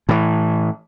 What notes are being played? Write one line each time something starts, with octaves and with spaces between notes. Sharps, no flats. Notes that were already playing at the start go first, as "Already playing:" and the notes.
A2 E3